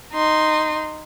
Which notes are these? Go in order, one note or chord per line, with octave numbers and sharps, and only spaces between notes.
D#4 C6